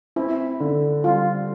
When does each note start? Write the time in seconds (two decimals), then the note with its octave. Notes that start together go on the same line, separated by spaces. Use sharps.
0.16 C4 E4
0.60 D3
1.04 G3 F4